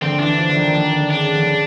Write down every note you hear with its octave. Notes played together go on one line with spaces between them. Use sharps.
D3 C4
E3 D4
F3
D3
D#3
D3
D#3
D3
C#3 D4
C#3
D3
C#3